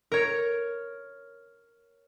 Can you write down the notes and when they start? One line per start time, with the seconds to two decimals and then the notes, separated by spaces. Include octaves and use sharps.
0.12 A#4 C#5